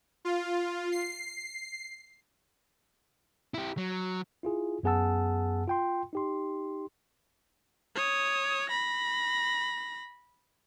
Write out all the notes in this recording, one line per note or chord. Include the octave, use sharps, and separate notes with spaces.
F4
C7
E4 G4
F#3
E4 F4 G#4
F#2 B3 G#4 F#5 A5 E6
F4 G5 C6
D#4 G4 C6
C#5 D#6
B5 A#6